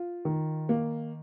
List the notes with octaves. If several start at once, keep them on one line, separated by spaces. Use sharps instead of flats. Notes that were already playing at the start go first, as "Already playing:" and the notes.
Already playing: F4
D#3
A#3